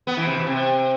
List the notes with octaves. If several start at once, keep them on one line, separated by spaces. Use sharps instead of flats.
B3
E3
C3
B2
C3